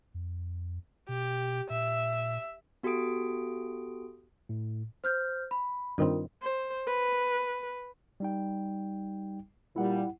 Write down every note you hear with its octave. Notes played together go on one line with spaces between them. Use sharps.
F2
B2 G4
A#2 E5
B3 F#4 G4 A4 D#6 D7
A2
C5 F6 G6
B5
G2 D#3 C4 F4 A#4
C5
B4
G3 D#4 G5
A#2 G3 E4 F#5